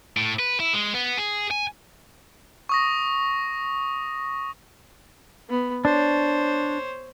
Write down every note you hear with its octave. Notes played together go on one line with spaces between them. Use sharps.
A2
B4
E4
G#3
B3
G#4
G#5
C#6 D#6 A#6
B3
D4 C5 C#5